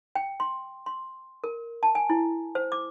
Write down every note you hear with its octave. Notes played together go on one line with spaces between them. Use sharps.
G5
C6
C6
A#4
A5
G#5
E4
C5
D6